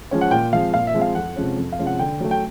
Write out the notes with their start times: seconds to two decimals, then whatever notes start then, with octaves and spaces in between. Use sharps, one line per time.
0.11 F3 G#3 C#4
0.21 F#5
0.31 A#2 G5
0.53 F3 G#3 C4 F5
0.74 A#2 F5
0.87 E5
0.94 F3 G#3 C4
1.01 F5
1.15 F2 F#5
1.36 C3 F3 G#3 C#4
1.58 F2
1.72 F5
1.79 C3 F3 G#3 C#4
1.87 F#5
1.99 D3 G5
2.20 F#3 A3
2.31 G5